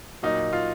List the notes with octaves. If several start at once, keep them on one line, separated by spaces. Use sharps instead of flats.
A#2 F#3 D#4
F4